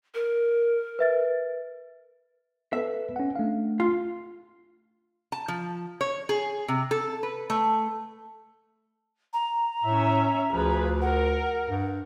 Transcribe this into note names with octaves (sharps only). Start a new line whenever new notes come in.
A#4
B4 E5 A6
B3 A4 B4 E5
C#4 F#5
A3 D4 F5
F4
A5
F3
C#5
G#4
C3
A4
B4
A3
A#5
A2 C#4 E5
D2 F3 G#4 B4
A#4 F#5
G2